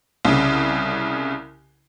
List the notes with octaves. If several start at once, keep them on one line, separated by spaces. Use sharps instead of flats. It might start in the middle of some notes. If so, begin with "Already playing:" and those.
C2 C#3